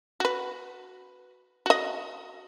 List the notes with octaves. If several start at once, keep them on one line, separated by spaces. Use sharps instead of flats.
F#4 B4
F#4 D#5